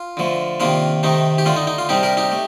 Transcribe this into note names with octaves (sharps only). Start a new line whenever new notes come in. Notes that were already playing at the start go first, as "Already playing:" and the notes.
Already playing: F4
D3 F3 A3
C3 D#3 A#3 D4 F4
C3 D#3 A3 D#4
G4
D3 A3 D4 F4
D#4
D#4
F4
C3 G3 D4 D#4 G4
G4 A#4
D#4 G4
A3